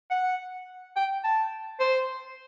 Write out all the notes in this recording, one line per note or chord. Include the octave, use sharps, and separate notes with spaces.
F#5
G5
A5
C5